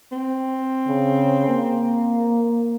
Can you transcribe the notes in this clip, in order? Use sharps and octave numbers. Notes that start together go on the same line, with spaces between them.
C4
C#3
A#3